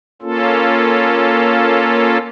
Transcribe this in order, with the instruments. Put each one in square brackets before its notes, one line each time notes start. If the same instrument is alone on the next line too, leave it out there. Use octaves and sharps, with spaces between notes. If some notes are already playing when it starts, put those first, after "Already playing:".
[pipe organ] A#3 C#4 F4 A4